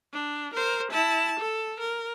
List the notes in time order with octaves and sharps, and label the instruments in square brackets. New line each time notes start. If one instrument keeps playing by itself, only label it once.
[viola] D4
A#4 C5
E4 A5
A4
A#4